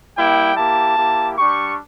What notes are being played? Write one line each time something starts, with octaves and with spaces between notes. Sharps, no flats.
G3 A#3 E4 G5
A#3 E4 G4 A5
A#3 E4 G4
G3 D4 G4 C#6